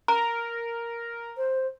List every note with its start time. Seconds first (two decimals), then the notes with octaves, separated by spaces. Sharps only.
0.08 A#4 A#5
1.37 C5